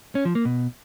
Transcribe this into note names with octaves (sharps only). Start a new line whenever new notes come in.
C#4
F3
A#3
B2